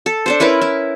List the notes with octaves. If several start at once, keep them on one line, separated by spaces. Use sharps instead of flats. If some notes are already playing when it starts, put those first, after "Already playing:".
A4
D4 A4 C5
C#4 E4 A#4 B4
E4